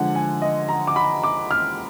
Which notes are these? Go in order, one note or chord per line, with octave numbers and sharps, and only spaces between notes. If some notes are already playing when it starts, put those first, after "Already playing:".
Already playing: D3 F3 G#3 F#5
G#5
D#5
A#5
D6
B5
D6
F6